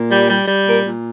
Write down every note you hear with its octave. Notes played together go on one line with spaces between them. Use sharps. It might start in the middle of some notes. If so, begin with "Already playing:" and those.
Already playing: A#2
G3
G3
G3
A#2 A#4
A#2